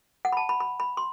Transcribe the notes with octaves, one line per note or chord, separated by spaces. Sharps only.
F#5
B5
A5
B5
B5
B5
C6